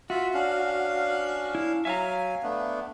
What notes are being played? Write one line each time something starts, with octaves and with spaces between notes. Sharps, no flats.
F4 F#4 E5
C#4 D4 F5
E4
F#3 E5 F5 G#5 A#5
A3 B3 D4